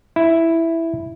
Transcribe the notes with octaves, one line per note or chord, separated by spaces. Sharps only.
E4